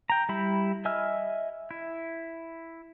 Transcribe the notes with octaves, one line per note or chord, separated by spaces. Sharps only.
G5 A#5
G3 E4 B5
D#5 E5 G#5 E6 F6
E4